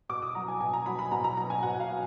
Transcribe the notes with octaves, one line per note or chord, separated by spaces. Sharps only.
B2 D6
D#6
F#3 A#5
G#5
B2 G#5
A#5
F#3 B5
B5
B2 A#5
A#5
F#3 A#5
G#5
B2 F#5
F5
F#3